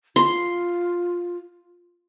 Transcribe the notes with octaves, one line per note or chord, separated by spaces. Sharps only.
F4 C6